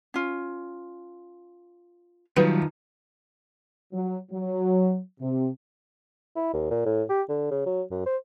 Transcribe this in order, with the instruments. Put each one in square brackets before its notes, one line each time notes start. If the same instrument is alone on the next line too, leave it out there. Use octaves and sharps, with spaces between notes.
[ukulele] C#4 F4
[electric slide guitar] D#3 F4 [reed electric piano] F#3 G3 [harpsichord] B3 [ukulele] D#4
[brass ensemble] F#3
F#3
C3
[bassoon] E4
D#2
A#2
A2
G4
D3
C#3
F#3
F#2
C5